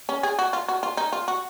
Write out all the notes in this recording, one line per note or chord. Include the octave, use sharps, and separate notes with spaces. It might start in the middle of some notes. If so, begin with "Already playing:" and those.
C#4
G#4
F#4
F4
F#4
F4
D#4
F4
F#4